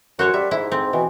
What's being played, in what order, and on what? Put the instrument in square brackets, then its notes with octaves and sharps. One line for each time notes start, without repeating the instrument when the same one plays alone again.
[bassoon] F#2 [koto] F#4 C5 C#5
[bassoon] G3 [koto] E5
[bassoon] G#2 [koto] E4
[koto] C4
[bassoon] B2 [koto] E3